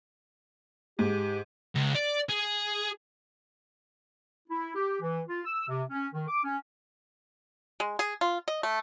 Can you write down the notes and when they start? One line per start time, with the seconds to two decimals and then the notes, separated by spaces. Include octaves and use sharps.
0.99 G#2 G4
1.76 C#2
1.95 D5
2.30 G#4
4.49 E4
4.75 G4
5.01 E3
5.28 F4
5.46 E6
5.68 C3
5.90 C#4
6.14 D#3
6.28 D6
6.44 C#4
7.80 G#3
7.99 G#4
8.21 F4
8.48 D#5
8.63 A3